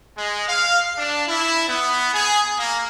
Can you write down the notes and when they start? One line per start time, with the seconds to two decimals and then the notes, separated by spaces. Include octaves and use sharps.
0.17 G#3
0.48 F5
0.98 D4
1.28 E4
1.68 B3
2.13 G#4
2.58 A#3